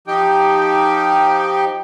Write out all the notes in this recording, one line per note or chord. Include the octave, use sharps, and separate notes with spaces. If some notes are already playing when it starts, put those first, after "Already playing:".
F3 D#4 G4 G5